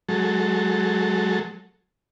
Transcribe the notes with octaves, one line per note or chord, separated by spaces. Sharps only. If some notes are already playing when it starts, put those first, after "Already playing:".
F#3 G#3 A4